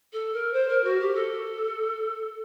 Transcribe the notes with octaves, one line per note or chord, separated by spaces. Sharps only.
A4
A#4
C5
A#4
F#4
G4
A4